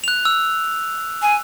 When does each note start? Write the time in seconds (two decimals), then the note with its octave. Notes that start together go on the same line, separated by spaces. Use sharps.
0.04 F#6 F7
0.25 E6
1.22 G#5